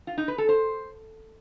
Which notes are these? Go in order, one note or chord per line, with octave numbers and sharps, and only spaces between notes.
F4
D#4
B4
A4
C5